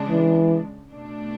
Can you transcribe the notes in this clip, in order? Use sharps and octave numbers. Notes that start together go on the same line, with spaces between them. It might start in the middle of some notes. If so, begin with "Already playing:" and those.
Already playing: C#3 G#3 D4
E3
B2 A3 D4